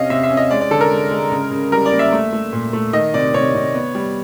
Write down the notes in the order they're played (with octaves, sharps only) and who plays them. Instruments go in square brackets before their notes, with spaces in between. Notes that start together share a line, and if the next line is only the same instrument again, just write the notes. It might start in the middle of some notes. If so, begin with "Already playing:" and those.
Already playing: [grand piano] C3 C#4 D#5 F5
C3 E5
E5
C#4
D#5
G#3 D5
D5
D3 A4
A#4
G#3
G#3
C#3
C#3
G3 A#4
D5
A#3
E5
A3
A3
A#2
A3
D#3 D#5
C3 D5
C3 C#5
C3
B3
G3